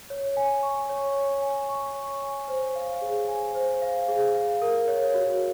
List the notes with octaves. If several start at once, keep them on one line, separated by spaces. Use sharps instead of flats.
C#5
G#5
C#6
C#5
C#5
G#5
C#6
C#5
G#5
C5
F5
G#4
G#5
C5
F5
G#4
F5
A#4
C#5
F#4